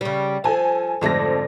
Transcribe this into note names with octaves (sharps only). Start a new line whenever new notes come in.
C#3 G3
F3 A4 G#5 A5
F2 G#2 D3 F3 A3 A#6